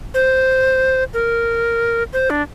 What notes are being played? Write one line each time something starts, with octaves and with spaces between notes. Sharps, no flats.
C5
A#4
C5
D4